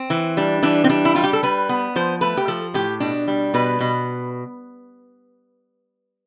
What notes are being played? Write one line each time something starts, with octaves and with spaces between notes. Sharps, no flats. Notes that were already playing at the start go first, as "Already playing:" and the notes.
Already playing: C4
E3
G3 D4
E3 D4
C4
G3 D4
E4
G3 F4
G4
A4
G3 B4
B3
F3 C5
A3 B4
G4
F3 A4
A2 G4
B2 D4
G3
B2 B4
B2